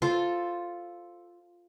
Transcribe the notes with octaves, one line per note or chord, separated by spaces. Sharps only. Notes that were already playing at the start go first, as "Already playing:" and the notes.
F4 A4 C5